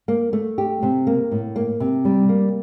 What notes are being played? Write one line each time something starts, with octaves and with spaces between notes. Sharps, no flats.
A#3
A3
G4
C3
A#3
A2
A#3
C3
G3
A#3